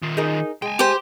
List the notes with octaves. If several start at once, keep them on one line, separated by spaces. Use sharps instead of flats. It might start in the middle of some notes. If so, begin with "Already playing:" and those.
D#3 F4
D#4 G#4 A#4
G#3 G5 G#5
G4 C5